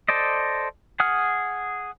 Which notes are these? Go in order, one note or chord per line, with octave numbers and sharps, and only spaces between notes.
A4 C5 D5 D#5
G#4 F#5 D#6 F6